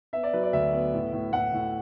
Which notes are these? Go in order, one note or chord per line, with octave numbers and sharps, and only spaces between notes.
B3 E5
D5
F#3 B4
D5
D2 E5
B3
A2
A2
A2 F#5
A2